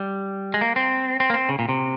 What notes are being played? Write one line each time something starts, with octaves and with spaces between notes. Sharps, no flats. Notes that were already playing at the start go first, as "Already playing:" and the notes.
Already playing: G3
G#3
A#3
C4
C4
A#3
C4
C#3
A#2
C3